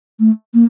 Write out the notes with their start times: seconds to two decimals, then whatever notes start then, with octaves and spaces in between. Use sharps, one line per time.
0.20 A3
0.54 A#3